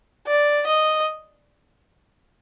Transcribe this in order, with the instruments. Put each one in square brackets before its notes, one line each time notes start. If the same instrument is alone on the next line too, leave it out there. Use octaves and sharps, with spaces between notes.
[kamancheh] D5
D#5